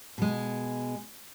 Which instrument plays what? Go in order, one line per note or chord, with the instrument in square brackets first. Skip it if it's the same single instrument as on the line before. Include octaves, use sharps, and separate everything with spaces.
[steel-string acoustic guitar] B2 G#3